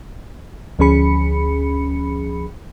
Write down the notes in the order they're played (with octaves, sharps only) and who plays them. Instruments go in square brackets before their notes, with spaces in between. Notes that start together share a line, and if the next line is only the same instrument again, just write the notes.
[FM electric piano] D2 F3 C#4 G#4 B5 C#7